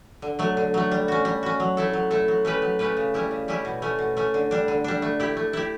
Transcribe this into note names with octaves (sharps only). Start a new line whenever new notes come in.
D3
F#3 A3
D3
F#3 A3
G3
C#4 F#4
G3
C#4 F#4
F#3
A3 E4 A4
F#3
A3 E4 A4
F#3
A3 C#4 G4 B4
F#3
A3 C#4 G4 B4
C#3
G3 C#4 E4 G4
C#3
G3 C#4 E4 G4
B2
A3 C#4
B2
A3 C#4
D3
G3 D4
D3
G3 D4
A3
E4 G4
A3
E4 G4